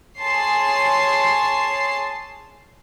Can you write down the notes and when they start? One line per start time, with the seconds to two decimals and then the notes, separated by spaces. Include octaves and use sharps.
0.18 G#4 C#5 A5 C6 C7